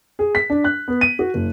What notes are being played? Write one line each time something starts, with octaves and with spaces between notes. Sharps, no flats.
G#4
B6
D4
F#6
B3
D#7
F#4
F#1